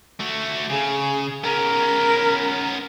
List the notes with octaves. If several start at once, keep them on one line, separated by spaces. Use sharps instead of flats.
A3 F#4
C#3 G#4
B3 C#4 A#4